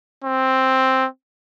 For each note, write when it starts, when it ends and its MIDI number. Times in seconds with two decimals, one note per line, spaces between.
0.25 1.06 60